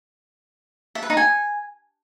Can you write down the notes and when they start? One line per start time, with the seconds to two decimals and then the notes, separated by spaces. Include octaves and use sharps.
0.95 E5
1.03 B4
1.10 D#4
1.17 G#5